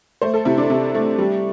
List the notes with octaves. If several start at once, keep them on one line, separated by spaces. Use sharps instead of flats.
A3 C5
A4
C3 E4
D4
C3
A3
G3